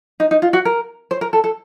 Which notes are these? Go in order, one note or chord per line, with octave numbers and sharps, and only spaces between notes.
D#4
D#4
F4
F#4
A#4
C5
A#4
A4
A4